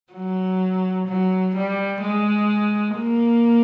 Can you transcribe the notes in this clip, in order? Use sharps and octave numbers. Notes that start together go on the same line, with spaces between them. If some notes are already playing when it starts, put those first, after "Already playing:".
F#3
F#3
G3
G#3
A#3